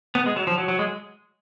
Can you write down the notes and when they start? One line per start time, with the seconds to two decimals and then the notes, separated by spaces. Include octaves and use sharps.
0.15 B3
0.26 G#3
0.36 F#3
0.47 F3
0.58 F#3
0.68 F#3
0.79 G#3